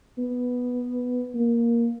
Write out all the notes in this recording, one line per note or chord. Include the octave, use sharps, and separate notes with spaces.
B3
A#3